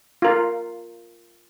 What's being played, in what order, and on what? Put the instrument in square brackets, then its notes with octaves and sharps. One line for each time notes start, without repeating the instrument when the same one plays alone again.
[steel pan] F4 A#4